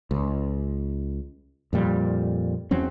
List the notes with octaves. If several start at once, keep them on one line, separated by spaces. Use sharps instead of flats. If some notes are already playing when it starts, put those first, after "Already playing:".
C#2
F2 A#2 G3
E2 F#3 C4 C#4